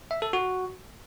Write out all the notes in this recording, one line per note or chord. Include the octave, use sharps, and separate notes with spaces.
E5
A4
F#4